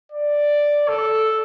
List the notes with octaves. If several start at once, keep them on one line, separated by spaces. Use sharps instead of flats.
D5
A4